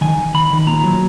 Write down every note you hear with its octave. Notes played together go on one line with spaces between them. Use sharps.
D#3 G#5
D#3
D#3 B5
D#3
A#2 A#5
F#3